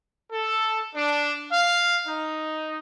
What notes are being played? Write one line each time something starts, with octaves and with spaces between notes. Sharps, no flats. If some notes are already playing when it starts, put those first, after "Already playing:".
A4
D4
F5
D#4